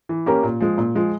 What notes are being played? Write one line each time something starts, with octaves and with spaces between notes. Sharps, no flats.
E3
A#3 C#4 G4 A#4
A#2
F3 G#3
A#2
F3 G#3